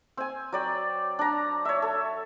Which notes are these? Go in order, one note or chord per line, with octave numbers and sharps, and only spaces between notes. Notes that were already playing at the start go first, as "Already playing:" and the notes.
C4 G#5
F#3 D5 G5
D4 A#5
C#5 E5
A4